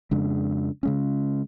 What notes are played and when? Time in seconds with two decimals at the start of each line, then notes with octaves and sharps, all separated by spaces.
0.11 F2 C#3 G#3 D4
0.83 C#3 G#3 C#4